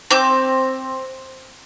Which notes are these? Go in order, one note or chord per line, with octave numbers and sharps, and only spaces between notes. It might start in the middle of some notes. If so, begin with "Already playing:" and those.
C4 D6 G6